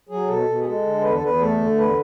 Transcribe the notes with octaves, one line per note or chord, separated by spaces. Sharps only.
F#3 G#4
B2 A4
B2
G#4
G#3 A4
D3
E2 B4
A4
E2 B4
A3 A4
D3
E2 B4